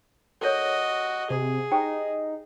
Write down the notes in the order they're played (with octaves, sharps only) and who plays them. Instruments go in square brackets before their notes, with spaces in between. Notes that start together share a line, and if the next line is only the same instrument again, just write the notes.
[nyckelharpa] F#4 D#5 [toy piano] A4 A#4 C#5
[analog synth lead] C3 [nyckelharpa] G#4
[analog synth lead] D#4 [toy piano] G4 C5 G5